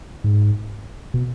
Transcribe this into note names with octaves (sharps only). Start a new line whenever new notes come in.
G#2
B2